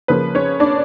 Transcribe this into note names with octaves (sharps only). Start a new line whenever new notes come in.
C#3 F3 A#3 B4
C#4 C#5
D4 D5